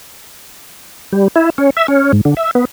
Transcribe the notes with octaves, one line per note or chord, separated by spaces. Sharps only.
G3
E4
C#4
E5
C#4
G#2
D3
E5
B3